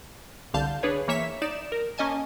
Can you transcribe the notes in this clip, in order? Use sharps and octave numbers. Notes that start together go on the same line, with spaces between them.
C2 D3 F5 A5 G6
D4 G#4 B4 C#5
E3 A#3 C#5 E5 B6
D#4 D5 E7
A#4
A#3 C#4 D#5 G#5 A5